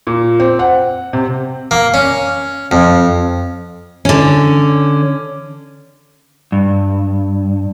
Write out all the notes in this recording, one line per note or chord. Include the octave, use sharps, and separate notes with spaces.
A#2
C4
F#5
C3
A#3
C#4
F2
D3 C#4
G2